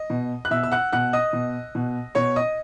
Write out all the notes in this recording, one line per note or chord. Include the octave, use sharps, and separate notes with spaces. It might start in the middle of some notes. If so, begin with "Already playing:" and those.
Already playing: D#5
B2
F#6
B2 E5 E6
E6
F#5 F#6
B2 F#5 F#6
D#5 D#6
B2
B2
B2 C#5 C#6
D#5 D#6